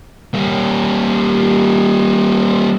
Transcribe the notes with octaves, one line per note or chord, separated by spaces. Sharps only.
G3 A#3